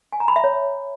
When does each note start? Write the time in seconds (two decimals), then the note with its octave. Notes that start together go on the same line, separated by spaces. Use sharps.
0.12 G#5
0.20 A#5
0.28 B5
0.36 E5
0.44 C#5